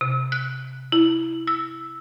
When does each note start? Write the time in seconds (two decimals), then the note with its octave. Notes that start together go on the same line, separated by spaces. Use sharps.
0.01 C3
0.32 F#6
0.92 E4
1.47 E6